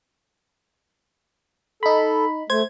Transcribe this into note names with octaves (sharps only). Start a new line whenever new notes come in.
D#4 A4 B5
A3 C5 G#6